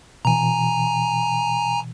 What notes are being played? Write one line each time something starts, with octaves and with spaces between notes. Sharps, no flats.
B2 E3 G#5 A#5